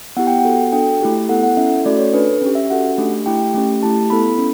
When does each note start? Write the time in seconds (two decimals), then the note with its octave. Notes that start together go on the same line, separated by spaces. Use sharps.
0.17 B3 E4 G4 F#5
0.27 G5
0.39 F#5
0.45 B3 F#4 A4
0.73 D4 F#4 A4 G5
1.00 A3 E4 G4
1.29 B3 E4 A4 F#5
1.43 F#5
1.57 C#4 E4 A4 E5
1.85 A3 C#4 F#4 A4 D5
1.99 C#5
2.14 D4 A4 B4
2.42 C#4 G4
2.55 E5
2.70 C#4 F#4 A4 F#5
2.98 A3 D4 G4
3.26 A3 E4 G4 G5
3.54 A3 C#4 G4
3.83 A3 E4 G4 A5
4.10 B3 E4 A4 B5
4.39 C#4